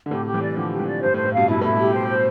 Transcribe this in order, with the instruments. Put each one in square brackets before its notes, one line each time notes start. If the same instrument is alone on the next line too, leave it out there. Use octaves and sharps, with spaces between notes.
[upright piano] D3
[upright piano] A2 C3 [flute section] G4
[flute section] G4
[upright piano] E3 G3
[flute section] D5
[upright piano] D3 F3 [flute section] G4
[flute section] G4
[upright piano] C3 E3
[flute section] D5
[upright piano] G2 [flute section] C5
[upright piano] A2
[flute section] C5
[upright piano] A2
[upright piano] G2 B2 [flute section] F5
[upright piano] G2 B2 [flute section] E4
[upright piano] A2 [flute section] E4
[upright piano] G2
[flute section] G4
C5
C5